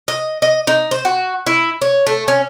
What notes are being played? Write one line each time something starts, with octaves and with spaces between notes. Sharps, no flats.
D#5
D#5
D#4
C5
F#4
E4
C#5
A3
C#4